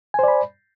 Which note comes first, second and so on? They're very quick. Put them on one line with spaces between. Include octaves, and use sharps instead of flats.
G#5 C5 D5 B5